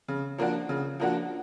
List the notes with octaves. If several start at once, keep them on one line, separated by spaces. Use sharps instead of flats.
C#3
F3 A#3 D4 F#4
C#3
F3 A#3 D4 F#4